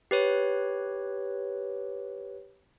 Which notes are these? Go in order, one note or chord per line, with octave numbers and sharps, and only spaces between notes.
G4 B4 C#5